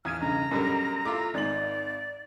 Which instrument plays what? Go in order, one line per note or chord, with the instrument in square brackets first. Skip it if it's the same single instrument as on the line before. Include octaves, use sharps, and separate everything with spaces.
[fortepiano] A#1 E2 [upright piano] D#6 G#6 D#7 [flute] F6
[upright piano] B1 G2 C#3 [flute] A#5
[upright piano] F#2 C#4 A#4 [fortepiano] B2 D3 G3
[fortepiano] A3 E4 F4 [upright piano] D6
[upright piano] G#1 F#7 [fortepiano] G#2 D#4 [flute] D5